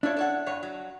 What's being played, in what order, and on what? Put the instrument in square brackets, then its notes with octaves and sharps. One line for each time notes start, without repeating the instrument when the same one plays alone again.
[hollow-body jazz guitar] D4 [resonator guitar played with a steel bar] E4 F4 C#5
[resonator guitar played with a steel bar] A4 C#5 F#5
G2 C#5
F#3